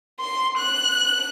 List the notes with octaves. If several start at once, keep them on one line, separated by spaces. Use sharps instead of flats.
C6
F#6